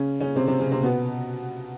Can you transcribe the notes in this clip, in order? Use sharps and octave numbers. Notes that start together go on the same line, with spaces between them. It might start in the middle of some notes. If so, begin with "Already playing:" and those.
Already playing: C#3 C#4
C#3 C#4
C3 C4
C3 C4
C#3 C#4
C3 C4
B2 B3